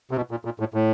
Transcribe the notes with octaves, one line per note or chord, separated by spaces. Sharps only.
C3
B2
A#2
A#2
A2
A2